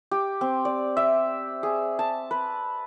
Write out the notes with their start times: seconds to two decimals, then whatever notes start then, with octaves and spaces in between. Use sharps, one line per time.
0.11 G4
0.41 C4
0.65 D5
0.97 E5
1.63 G#4
1.99 A5
2.31 B4